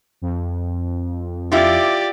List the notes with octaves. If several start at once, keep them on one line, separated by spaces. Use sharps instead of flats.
F2
E4 F4 G4 D5